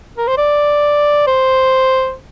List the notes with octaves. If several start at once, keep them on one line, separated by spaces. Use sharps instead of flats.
A#4
C5
D5
C5